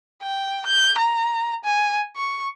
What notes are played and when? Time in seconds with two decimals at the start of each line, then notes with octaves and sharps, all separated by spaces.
0.22 G5
0.66 G6
0.98 A#5
1.64 G#5
2.16 C#6